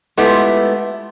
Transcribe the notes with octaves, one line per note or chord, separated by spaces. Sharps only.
G#3 A3 B3 E4 F4 G4